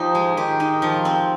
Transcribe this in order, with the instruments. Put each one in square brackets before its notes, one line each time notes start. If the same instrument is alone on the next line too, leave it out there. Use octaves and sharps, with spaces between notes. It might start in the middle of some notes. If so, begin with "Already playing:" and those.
Already playing: [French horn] F3 [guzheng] D#4 G4
[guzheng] G#3
[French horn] D#3 [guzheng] G4
[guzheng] D#4
F3
C4